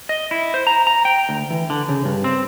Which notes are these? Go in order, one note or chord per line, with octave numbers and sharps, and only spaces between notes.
D#5
E4
C5
A#5
A#5
G5
D2
E3
D3
C#3
G2
C4